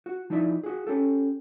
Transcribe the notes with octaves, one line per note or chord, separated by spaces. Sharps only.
F#4
F3 D#4 E4 D5 E5
F#4 G#4
C#4 G4 A4